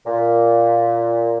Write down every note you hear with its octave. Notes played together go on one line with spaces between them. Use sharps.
A#2